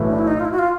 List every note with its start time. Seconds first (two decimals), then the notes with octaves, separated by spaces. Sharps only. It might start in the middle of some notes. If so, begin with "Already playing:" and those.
Already playing: B1 A2 E3 A3
0.08 D4
0.18 E4
0.27 D#4
0.40 F4
0.45 E4
0.52 F#4
0.59 F4